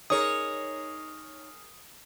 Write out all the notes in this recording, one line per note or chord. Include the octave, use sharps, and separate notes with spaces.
D#4 G#4 A#4 C#5 D#6